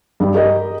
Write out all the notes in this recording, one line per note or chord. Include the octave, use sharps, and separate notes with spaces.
G2 G3
G4 A#4 D#5